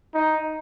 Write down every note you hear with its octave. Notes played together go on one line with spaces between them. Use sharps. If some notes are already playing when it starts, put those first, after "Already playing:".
D#4